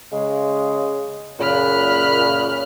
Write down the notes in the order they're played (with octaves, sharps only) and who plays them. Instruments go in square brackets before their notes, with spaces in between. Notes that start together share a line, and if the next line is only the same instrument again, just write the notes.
[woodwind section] C#3 G#3
[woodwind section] F#2 A#2 C#3 [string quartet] B5 F6 F#6